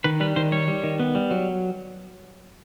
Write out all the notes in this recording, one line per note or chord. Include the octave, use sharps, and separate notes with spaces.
D#3 B4
G3 B4
D#3 C5
G3 C#5
G3
D#3
B3
G3
F#3